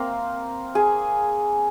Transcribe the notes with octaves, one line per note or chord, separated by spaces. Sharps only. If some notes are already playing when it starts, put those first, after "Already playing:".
Already playing: A#3 C4
G#4